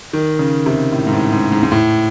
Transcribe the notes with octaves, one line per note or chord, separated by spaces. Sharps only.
D#3
C#3
C3
A2
G#2
A2
G#2
G#2
G#2
A2